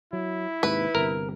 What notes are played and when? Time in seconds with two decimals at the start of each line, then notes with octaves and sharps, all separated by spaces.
0.13 F#3 E4
0.63 D#2 G#2 C3 B4
0.95 G1 C3 A#4